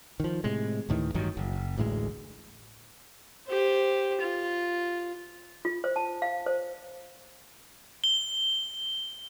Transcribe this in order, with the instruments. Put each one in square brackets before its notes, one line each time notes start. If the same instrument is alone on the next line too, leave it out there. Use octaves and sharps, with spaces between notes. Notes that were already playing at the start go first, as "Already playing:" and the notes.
[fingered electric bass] D#3 F3
A2 C3 G#3
D2 A2 D#3 E3
A1 G2 D#3 F#3
F#1
A1 D2 A2 G#3
[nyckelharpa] G4 C5
F4
[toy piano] F4
C5
A5
F5
C5
[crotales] G7